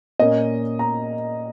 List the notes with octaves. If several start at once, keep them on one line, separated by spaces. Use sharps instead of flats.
A#2 A#3 C#4 D#5
A#5